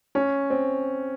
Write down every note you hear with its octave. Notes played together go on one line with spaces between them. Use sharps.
C#4
C4